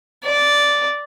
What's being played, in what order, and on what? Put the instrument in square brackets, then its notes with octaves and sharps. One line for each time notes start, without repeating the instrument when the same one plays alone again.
[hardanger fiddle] D5